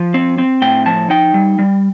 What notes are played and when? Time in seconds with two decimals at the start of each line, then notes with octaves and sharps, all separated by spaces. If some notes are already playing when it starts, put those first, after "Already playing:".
Already playing: F3
0.14 C4
0.38 C4
0.62 A2 G5
0.86 F3 A5
1.10 D#4 G5
1.34 G3
1.59 G3